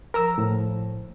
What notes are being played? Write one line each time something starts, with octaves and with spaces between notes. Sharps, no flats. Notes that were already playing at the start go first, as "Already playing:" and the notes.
F3 A#4 A#5 E6
A2